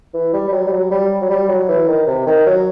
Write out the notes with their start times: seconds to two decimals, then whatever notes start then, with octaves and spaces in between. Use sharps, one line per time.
0.14 E3
0.33 G3
0.48 G3
0.52 F#3
0.66 G3
0.72 F#3
0.91 G3
1.21 F#3
1.30 G3
1.49 F#3
1.68 E3
1.88 D#3
2.07 C3
2.26 D#3
2.46 F#3